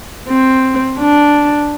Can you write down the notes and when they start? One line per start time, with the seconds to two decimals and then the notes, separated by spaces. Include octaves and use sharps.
0.28 C4
1.00 D4